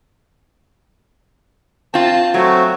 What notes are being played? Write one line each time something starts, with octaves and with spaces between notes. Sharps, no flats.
C4 F4 A5
F#3 A3 C4 F#4